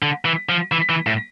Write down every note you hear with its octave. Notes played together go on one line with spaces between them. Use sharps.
D3
E3
F3
E3
E3
A2